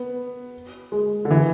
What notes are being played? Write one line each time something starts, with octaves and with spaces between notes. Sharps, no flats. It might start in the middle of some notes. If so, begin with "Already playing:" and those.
Already playing: B3
G#3
D3
E3